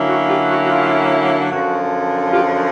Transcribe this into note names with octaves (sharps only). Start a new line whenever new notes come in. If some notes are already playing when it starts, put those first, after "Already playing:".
Already playing: D3 F#3 A#3 C#4 E4
F#4
F4 G4
F#4
F#4
F4
F#2 D3 F3 F#4
F4 G4